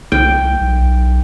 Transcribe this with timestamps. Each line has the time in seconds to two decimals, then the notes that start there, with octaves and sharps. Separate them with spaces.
0.12 C2 G5
0.61 B1